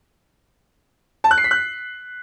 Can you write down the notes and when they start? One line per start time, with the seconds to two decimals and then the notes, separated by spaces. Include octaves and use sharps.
1.24 A5
1.31 F#6
1.38 C7
1.44 B6
1.51 F#6